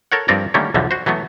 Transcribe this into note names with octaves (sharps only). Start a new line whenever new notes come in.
A4 A#4 C#5 F#5
G2 F3 C4 A#4 D5 A#5
D3 D#3 G3 A3 A#3 C#4
B1 E2 D3 E3 F3
F#4 C5
E3 F#3 A3 B3